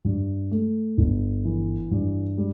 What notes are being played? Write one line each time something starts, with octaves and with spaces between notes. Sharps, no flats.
G2
A3
G1
E3
G2
G3